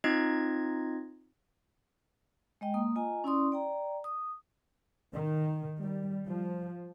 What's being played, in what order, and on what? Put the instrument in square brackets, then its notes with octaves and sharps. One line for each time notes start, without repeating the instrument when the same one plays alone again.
[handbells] C4 D#4 F4 D#5 G#6
[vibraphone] G#3 D#5 G5
A#3 D#6
F4 D#5 G#5 A#5
C#4 E4 D5 C6 D#6
D5 G5 A#5
D#6
[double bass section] D#3
G3
F3